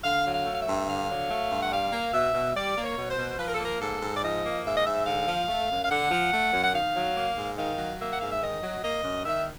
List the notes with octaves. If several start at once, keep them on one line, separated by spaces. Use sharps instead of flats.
D3 F5
F#3
F5
A3
F5
E5
G2
D3 F5
F#3
A3
G2
F#5
G3 F5
A#3
B2 E5
B2
G3 D5
A#3
C#5
B2
C5
B2
F3 B4
A#4
A4
A#3 A#4
G#2 A4
G#2
D5
F3 D#5
A#3
G#2 E5
D#5
G#2 E5
D3 F5
F3
A3
F#2
F5
D3 F#5
F3
A3
F#2
F#5
D#3 F5
F#3
A#3
G#2
D#3 F5
F#3
A#3 E5
F#5
G#2 F5
E5
D#3 D#5
F#3
A#3 D#5
F#2
D#3 E5